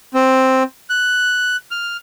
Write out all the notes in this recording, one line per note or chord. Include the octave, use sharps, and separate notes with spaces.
C4
F#6
F6